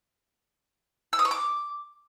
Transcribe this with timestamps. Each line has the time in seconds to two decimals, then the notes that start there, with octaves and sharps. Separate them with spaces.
1.13 E6
1.19 D#6
1.25 C#6
1.31 D6